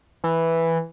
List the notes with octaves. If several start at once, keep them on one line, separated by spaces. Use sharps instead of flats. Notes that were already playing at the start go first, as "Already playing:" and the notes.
E3